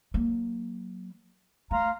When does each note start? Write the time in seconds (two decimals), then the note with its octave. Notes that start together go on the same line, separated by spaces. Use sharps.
0.14 F#3 A#3
1.71 A3 F5 A#5 C6